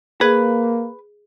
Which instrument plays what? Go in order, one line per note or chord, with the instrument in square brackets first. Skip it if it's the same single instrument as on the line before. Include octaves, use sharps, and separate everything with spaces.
[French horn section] A#3 [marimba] G#4 [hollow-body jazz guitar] B4